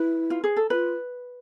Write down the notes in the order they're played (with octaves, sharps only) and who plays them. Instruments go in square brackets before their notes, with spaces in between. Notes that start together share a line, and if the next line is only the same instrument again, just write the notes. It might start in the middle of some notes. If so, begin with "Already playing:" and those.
Already playing: [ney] E4 [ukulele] B4
[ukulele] F4
G#4
A4
[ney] F4 [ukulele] B4